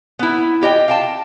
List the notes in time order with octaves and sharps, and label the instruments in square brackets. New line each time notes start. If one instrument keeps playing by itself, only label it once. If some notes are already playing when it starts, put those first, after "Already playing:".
[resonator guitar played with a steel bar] B3 E4
F4 G4 D#5 G5
F5 G5 A5